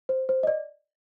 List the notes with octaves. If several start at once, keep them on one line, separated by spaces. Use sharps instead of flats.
C5
C5
D#5
D5